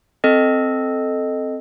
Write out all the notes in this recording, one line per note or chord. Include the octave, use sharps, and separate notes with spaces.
C4 A4 D#5